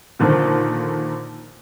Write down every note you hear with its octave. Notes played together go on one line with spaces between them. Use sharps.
A#2 D3 D#3 F3